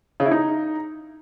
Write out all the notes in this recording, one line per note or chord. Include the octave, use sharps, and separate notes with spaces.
C#3
E4
D#4